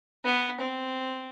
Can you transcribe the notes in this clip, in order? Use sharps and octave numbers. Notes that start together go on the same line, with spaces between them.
B3
C4